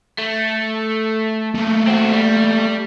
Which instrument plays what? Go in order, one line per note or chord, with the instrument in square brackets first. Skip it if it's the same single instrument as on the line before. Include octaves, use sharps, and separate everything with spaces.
[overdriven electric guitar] A3
[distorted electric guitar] A3 A#3
[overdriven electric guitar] C4 F#4
G3